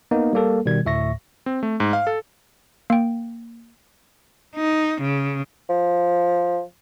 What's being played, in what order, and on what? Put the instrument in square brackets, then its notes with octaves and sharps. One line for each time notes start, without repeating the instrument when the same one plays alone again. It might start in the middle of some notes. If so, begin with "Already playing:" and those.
[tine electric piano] A#3 B3 D#4
G3 A#3 A4
B2 D#3 G3 G#6
D2 A2 E5 C#6 A#6
[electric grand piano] C4
A3
G#2
F5
A4
[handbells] A#3 G5
[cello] D#4
C#3
[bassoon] F3